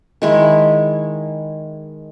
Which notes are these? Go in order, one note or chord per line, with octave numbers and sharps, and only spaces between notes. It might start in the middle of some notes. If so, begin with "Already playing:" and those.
D#3 G#3 E4